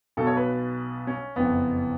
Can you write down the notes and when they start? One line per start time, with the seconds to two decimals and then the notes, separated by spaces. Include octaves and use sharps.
0.17 B1 B2 A4
0.27 C#5
0.37 B4
1.07 C#4
1.36 F#1 F2 C#3 B3